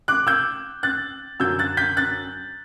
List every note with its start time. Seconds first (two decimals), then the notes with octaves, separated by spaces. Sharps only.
0.08 D6 F#6
0.27 E6 G6
0.83 F#6 A6
1.40 F#2 D3 F#3 E6 G6
1.59 F#6 A6
1.77 G6 B6
1.97 F#6 A6